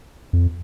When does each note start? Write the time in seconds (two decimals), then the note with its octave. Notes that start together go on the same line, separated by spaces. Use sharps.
0.33 F2